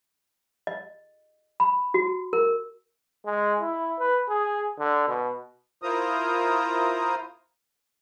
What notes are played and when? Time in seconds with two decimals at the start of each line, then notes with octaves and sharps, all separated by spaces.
0.67 D#5
1.60 B5
1.94 F#4
2.33 A#4
3.26 G#3
3.60 E4
3.99 B4
4.28 G#4
4.79 D3
5.08 B2
5.83 E4 F4 A#4 C5 A#5 D#6